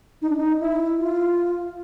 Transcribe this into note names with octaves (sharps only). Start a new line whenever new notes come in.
D#4
D4
D#4
E4
F4